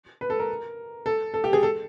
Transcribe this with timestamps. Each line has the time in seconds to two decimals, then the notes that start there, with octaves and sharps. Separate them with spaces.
0.21 B4
0.30 A4
0.40 A#4
1.06 A4
1.34 A4
1.44 G4
1.53 G#4
1.63 A4